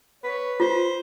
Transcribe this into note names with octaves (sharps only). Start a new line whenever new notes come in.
B4 C#5
F4 C5